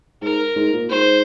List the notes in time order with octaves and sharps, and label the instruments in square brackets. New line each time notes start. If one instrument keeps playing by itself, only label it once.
[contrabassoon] G#2 [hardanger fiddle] A#4
[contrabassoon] G#2
A#2
[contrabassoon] G#2 [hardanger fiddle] C5